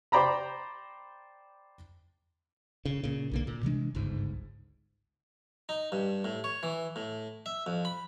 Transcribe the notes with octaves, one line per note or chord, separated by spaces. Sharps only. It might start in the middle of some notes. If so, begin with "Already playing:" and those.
C5 D5 G5 A#5 B5
C#3
A#2 C#3
B1 D3 A#3
A#2
C3 E3 G#3 D4
G1 C#2 G#2
D#4
G2
A2
C#5
E3
A2
E5
F2
B5